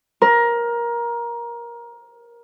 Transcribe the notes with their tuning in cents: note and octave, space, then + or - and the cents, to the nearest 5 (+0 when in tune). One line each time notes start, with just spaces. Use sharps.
A#4 +20